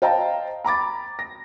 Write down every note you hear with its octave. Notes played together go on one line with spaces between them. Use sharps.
C5 D#5 F5 G5 A5 A#5
A#5 B5 D6 A6
A#6